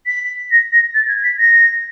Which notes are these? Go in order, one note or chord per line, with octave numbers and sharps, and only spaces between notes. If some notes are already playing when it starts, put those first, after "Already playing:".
B6
A#6
A#6
A6
G#6
B6
A#6